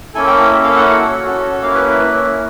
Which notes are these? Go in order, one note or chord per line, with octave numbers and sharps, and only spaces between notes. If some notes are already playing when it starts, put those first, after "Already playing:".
A#3 C#4 E4 A4 G#5
G5
A#3 C#4 E4 A4 E5
F5
F#5
C#4 F#4 A4
C#4 F#4 A4
A#3 C#4 E4 F5
B4
B4
A#3 C#4 E4